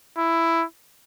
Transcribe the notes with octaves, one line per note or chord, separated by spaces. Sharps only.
E4